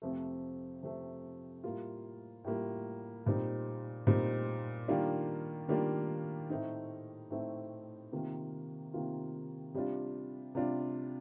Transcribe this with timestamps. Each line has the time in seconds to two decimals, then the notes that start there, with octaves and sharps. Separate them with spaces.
0.02 F2 C3 F3 A3
0.83 F2 C3 F3 A3
1.64 A2 G3 A#3 F4
2.44 A2 G3 A#3 F4
3.26 A#2 G3 C4 D#4
4.07 A#2 G3 C4 D#4
4.88 D#3 G3 A#3 D4 F4
5.68 D#3 G3 A#3 D4 F4
6.50 A2 A3 C4 D#4
7.30 A2 A3 C4 D#4
8.12 C3 D#3 A#3 F4
8.94 C3 D#3 A#3 F4
9.74 C3 G3 D4 F4
10.55 C3 G3 D4 F4